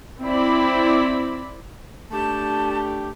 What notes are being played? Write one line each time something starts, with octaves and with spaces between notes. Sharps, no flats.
C4 E4 D5 B5
A3 D4 G4 A5